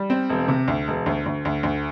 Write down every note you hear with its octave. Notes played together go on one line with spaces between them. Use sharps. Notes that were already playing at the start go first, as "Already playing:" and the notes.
Already playing: G3
C4
E1
C3
D2
E1
D2
D2
D2
D2